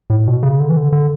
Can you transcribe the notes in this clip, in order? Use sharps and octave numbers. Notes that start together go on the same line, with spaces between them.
A2
B2
C#3
D3
E3
D3
D3